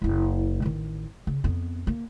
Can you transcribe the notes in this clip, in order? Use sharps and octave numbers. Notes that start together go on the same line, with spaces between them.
F#1 E4
A1 D#3
C#3
F2 B3
A#3